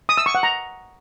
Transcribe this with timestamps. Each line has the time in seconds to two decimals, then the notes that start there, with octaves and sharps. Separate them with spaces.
0.09 D#6
0.18 E6
0.26 C#6
0.35 F#5
0.43 A#5